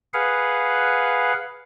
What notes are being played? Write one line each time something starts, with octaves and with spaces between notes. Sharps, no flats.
G#4 B4 F5 F#5